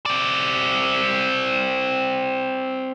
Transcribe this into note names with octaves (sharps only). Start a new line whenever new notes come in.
C4 D5